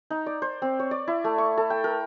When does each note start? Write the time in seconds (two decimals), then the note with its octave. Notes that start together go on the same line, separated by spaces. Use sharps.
0.10 D#4
0.26 D5
0.42 C5
0.62 C4
0.80 C#5
0.91 D5
1.08 E4
1.24 A3
1.38 C#6
1.58 A4
1.70 G5
1.84 A#4